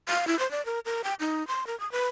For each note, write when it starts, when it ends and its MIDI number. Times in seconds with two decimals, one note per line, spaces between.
0.08 0.27 77
0.27 0.38 64
0.39 0.50 72
0.51 0.64 74
0.66 0.79 70
0.86 1.02 70
1.04 1.14 79
1.20 1.46 63
1.48 1.67 84
1.67 1.78 70
1.80 1.91 87
1.92 2.08 71